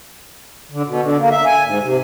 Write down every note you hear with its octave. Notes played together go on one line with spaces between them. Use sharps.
D3
B2
D3
A#3
E5
G#5
G#2
C3